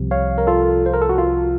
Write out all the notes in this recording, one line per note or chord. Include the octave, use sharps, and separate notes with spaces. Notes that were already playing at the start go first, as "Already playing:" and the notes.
Already playing: C2 C3 F3
C#5 F5
A#4
F4 A4
C5
A#4
A4
F#4
F4